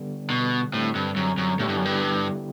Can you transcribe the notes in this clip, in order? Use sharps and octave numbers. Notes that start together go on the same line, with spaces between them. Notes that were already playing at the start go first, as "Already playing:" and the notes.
Already playing: D3 G3 B3
B2
A2 D3 G3 C4
G2
F#2
F#2
A2 D3 G3 B3 E4 G4
G2
F#2
G2